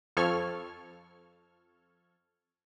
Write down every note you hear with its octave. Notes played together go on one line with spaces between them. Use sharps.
F2 F3 A4 C#6 F6 G#6